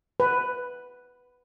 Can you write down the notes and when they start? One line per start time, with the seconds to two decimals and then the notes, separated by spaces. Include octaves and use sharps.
0.20 B4